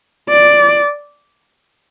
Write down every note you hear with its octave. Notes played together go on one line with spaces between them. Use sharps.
D5